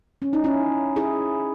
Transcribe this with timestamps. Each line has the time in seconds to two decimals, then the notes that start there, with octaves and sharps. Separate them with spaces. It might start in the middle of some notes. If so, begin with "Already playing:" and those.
0.22 C#4
0.33 D#4
0.44 C#4 E4
0.96 E4 G#4